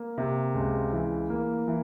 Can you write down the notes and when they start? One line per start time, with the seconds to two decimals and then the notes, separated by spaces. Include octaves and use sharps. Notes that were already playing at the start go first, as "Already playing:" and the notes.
Already playing: A#3
0.18 C3
0.55 C#2
0.93 E3
1.30 A#3
1.68 E3